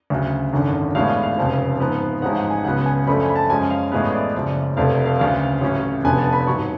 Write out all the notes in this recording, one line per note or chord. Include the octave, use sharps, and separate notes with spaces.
D2 C#3 F#3
G#1 F#2 D3
A1 A2 G#3 B3 D4 F5
F5
F5
F1 F2 C#3 F3
G#2 F3 B3
A1 G#2 F3 G#3 F#5
F#5
G#5
C#2 C#3 F#3 B3 F#5
G#5
F#2 F3 A3 D4 B5
G#5
B5
A5
F#2 F3 G#3 C#4 G#5
F5
A1 A2 G#3 B3 F5
D5
F#1 F#2 F3 D5
F1 F2 F3 A3 D4 F5
F5
D2 C#3 F#3 F5
A1 A2 F#3 C#4
F1 F2 D3 F3 B3 G#5
A5
B5
A1 G#2 F#3 C#6